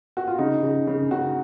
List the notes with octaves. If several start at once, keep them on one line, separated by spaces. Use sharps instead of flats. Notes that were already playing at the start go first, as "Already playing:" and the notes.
F#4
F4
C#3 D#4
C#3
C#3
C#3 F#4